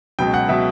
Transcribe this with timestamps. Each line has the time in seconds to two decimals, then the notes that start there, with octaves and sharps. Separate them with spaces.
0.19 C#2 B2 F#3 G5
0.34 F#5
0.49 B2 F#3 E5